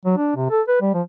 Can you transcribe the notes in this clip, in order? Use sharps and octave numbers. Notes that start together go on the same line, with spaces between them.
F#3
D4
C3
A4
B4
G3
F3